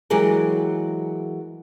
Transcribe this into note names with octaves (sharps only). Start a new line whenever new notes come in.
E3 F#3 G#3 G4 G#4 A#4